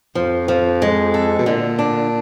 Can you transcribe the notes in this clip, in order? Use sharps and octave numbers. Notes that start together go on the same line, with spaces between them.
F2 F3
F3
G#3
A4
B2
A#2 D3
D4